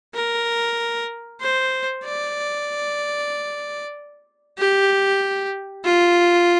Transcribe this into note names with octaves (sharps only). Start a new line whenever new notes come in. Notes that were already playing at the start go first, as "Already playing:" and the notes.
A#4
C5
D5
G4
F4